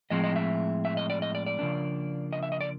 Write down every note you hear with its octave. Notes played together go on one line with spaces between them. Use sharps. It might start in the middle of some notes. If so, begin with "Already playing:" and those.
A2 F3 G#3 C4 D#5
D#5
E5
E5
D#5
D5
D#5
D5
D5
C#3 F3 A#3 D4
D#5
E5
D#5
D5